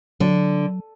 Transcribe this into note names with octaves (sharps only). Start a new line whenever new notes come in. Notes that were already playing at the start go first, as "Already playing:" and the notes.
D3 F#3